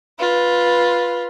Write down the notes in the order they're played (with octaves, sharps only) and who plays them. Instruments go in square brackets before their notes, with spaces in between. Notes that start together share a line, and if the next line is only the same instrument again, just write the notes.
[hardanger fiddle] F4 B4